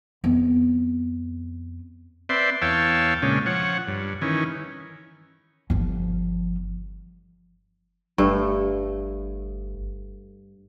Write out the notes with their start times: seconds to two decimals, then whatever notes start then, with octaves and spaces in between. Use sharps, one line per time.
0.24 F2 B3
2.29 C4 B4 D5 E5 C6
2.62 E2 C#5 F5 G5 A5 E6
3.22 A#2 C#3 G#3 C#4 D4
3.46 F3 C#5 F#5
3.88 G2
4.22 D#3 E3 C#4
5.70 G1 F3
8.18 G1 G2 A3